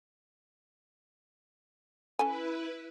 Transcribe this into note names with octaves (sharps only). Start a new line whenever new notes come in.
C#4 E4 A4 B4 G#5